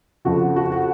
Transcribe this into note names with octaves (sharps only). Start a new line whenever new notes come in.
F2 C#3 F3 F#4
F#4
F#4